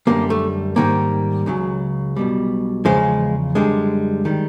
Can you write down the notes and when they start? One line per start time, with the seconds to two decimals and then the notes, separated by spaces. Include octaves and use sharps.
0.07 F#2 D3 G3 A#3
0.30 A3
0.76 G#2 D#3 G3 A#3
1.46 C#2 C#3 F#3
2.17 B1 B2 G3
2.85 E2 C#3 F3 G#3
3.55 F#2 D3 G3 G#3
4.25 D#3 G3